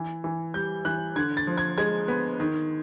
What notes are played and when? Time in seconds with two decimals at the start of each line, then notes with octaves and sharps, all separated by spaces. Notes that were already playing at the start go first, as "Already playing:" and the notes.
Already playing: E3
0.24 E3
0.54 G3 G6
0.85 E3 F#6
1.16 D3 G#6
1.37 A6
1.47 F3
1.58 G#6
1.78 G#3 G#6
2.08 B3
2.40 D#3